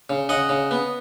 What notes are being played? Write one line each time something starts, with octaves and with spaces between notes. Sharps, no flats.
C#3
C#3 D#5 F#5
C#3
B3